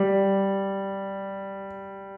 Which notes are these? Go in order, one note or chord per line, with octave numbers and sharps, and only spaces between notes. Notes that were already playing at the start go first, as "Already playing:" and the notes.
Already playing: G3